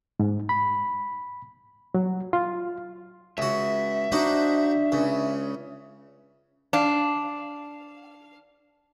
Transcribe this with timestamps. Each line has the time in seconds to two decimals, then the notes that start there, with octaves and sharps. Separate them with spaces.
0.20 G#2
0.49 B5
1.94 F#3
2.33 F4
3.38 C#2 F#4 E5 G#5
4.12 D4 D#4 F#4 C5
4.92 C#2 C#3
6.73 D4 F5